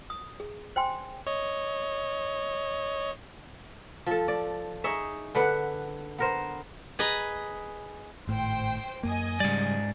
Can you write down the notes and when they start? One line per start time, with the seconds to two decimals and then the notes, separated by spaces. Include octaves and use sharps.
0.10 D#6
0.40 G#4
0.76 C5 G5 G#5 C6
1.27 C#5 D#5
4.06 F3 A4
4.28 D5
4.84 D#4 G#4 C#5 E5
5.35 D3 D4 B4 F#5
6.18 B3 A#4 C5
6.99 G#4 B4 D#5 A#5
8.28 G#1 A2 C5 G5
9.03 F#2 A#3 D#5 G#5 D#6
9.40 G#2 C#3 G3 D5